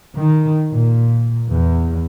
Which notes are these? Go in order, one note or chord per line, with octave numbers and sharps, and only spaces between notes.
D#3
A#2
E2